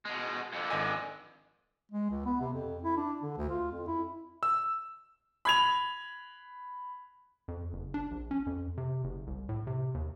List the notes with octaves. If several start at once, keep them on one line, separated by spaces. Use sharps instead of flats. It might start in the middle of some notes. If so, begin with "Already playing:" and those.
B2 G#3
F2 D3
G#1 D#5 G#5
G#3
C#2
B3
C3
F2
E4
D4
D3
D2
F4
F2
E4
E6
B5 G#6 F7
F2
F#1
D4
A#1
C#4
F2
C3
F#1
C2
A2
C3
D#2